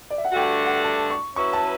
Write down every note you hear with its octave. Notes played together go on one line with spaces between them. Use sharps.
D5
E5
F#5
G2 D3 A3 D4 F#4 G5
F#5
A5
C#6
F#3 C#4 E4 B4 C#6
A5